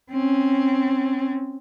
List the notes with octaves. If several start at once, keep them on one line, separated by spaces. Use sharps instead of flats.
C4 C#4